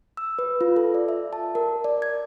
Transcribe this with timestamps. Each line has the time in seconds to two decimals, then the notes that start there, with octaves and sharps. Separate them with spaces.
0.17 E6
0.39 B4
0.61 F4
0.76 A4
0.94 D5
1.08 E5
1.33 A5
1.55 A#4
1.84 D5
2.02 G#6